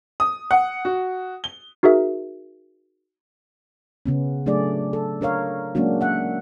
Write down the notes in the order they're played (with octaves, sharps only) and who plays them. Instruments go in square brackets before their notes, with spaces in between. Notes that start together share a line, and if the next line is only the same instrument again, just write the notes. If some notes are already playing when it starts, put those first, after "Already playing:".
[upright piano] D#6
F#5
F#4
G7
[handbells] D#4 F#4 G#4 A#4 E5
[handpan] C#3 B3 C#4
F#3 A3 D4 G#4 D5
A4
D4 A#4 C#5 F5
F#3 G#3 A#3 C#4 D4 F#4
E5 F#5